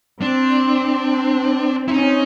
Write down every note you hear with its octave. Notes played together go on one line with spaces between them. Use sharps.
C4 D4
E4
C#4 D#4